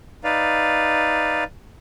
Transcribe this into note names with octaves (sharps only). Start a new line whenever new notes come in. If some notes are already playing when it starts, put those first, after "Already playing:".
D#4 B4 D5 F5